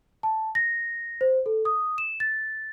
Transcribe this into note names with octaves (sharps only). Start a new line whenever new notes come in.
A5
A#6
C5
A4
D#6
E7
A6